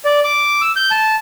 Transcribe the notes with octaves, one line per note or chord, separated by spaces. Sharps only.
D5
D6
E6
G6
A5